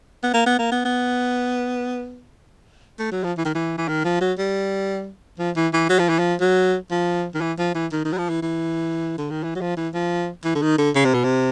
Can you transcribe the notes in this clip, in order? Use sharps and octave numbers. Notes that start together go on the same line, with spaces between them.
B3
A#3
B3
A#3
B3
B3
A3
F#3
F3
E3
D#3
E3
E3
D#3
F3
F#3
G3
F3
E3
E3
F#3
F3
E3
F3
F#3
F3
D#3
E3
F3
E3
D#3
D#3
F#3
F3
E3
E3
D3
D#3
E3
F#3
F3
E3
F3
E3
D3
D#3
D3
C#3
C3
B2
C3